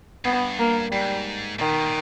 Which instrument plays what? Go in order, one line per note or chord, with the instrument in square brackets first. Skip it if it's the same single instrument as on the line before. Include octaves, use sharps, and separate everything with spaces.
[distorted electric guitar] G2 [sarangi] B3
[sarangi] A#3
[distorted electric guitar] G#2 [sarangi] G3
[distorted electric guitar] A#2 [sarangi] D#3
[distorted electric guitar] B2
A#2